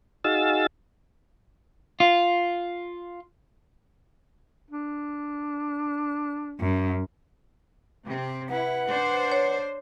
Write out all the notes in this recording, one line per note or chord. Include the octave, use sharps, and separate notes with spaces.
D#4 F#4 G#4 F5 E6 A6
F4
D4
F#2
C3 C4
E4 B4 F#5
D4 C5
C#5